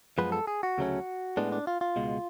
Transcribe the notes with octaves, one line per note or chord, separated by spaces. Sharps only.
F#2 F3 G#3 B3 B4
A4
G#4
F#4
D2 C#3 F#3 A3 C#4
A2 G#3 B3 D4
D4
F4
F4
C#2 B2 G#3